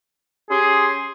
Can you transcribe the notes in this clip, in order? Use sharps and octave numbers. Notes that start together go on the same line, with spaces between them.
C#4 G4 G#4 C6